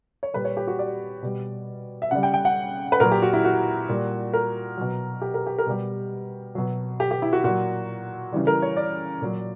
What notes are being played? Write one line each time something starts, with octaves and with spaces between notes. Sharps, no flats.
C#5
A#2 G3 B4
C#5
G4
F#4
D5
B2 G3
E5
C#3 G3 F#5
G5
G5
F#5
B4
A#2 F#3 A#4
G4
F#4
E4
F#4
A#2 G3
A#4
B2 F#3
G4
A#4
G4
A#4
B2 G3 G4
B2 F#3
G4
G4
E4
F#4
A#2 F#3 F#4
C#3 E3 G3
A#4
C#5
D5
A#2 F#3